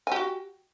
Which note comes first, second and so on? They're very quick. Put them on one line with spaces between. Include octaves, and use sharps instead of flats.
G#5 G4 F#4